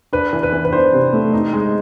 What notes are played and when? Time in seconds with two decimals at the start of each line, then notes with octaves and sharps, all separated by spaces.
0.13 D4 B4
0.33 E3
0.43 B4
0.52 E3
0.65 B4
0.72 D4 C5
0.93 C3
1.13 A3
1.33 D#4
1.53 G#3